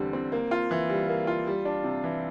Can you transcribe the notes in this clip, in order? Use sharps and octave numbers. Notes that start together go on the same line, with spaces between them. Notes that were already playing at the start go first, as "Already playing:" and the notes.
Already playing: E2 D3 G3 C4
C4
A#3
F4
E3
G3
A#3
F4
G3
D4
C3
E3